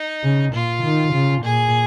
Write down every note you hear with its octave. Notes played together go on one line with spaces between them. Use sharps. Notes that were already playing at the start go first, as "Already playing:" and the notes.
Already playing: D#4
C#3
A#2 F4
D#3
C#3
A#2 G#4